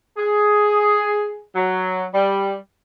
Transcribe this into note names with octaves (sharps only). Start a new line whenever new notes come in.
G#4
F#3
G3